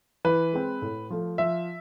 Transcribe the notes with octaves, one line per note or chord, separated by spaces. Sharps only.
E3 B4
G#3 C4
A2
F3 A3
F3 E5